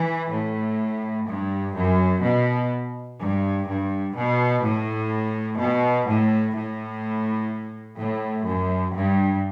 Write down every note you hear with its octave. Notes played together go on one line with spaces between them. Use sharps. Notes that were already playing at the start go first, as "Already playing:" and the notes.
Already playing: E3
A2
G2
F#2
B2
G2
G2
B2
A2
B2
A2
A2
A2
F#2
G2